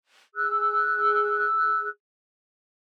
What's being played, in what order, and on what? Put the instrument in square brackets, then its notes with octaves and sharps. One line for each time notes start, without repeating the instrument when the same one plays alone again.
[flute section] G#4 E6 F#6